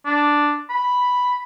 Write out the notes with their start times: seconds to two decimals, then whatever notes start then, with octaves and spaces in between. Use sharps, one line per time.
0.06 D4
0.70 B5